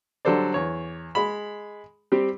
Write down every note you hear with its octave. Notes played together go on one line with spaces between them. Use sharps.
D3 F#3 G3 A4 C5 D5
E2 C#5
G#3 B5
G3 C4 G4